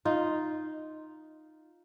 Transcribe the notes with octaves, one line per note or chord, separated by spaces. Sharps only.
D#4 F4